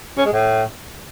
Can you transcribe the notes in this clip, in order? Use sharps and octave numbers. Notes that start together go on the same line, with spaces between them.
C#4
G#3
A2